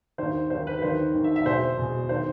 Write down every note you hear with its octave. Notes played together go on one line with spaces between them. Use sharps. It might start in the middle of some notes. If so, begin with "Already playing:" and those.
D#2 D#3 C5
D#2 D#3 C5
B4
D#2 D#3 C5
D#2 D#3
E5
E5
E2 B2 C5
E2 B2
D#3 C5